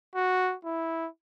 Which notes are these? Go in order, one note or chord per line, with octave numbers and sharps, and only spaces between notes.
F#4
E4